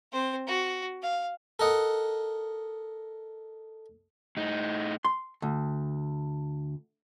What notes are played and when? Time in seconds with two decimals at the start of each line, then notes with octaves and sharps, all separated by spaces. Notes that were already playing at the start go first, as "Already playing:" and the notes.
0.13 C4 C5
0.47 F#4
1.02 F5
1.59 A4 A#4 D#5 F#5
4.37 A2 D#4
5.05 C6
5.42 D2